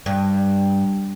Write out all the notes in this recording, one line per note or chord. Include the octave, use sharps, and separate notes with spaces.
G2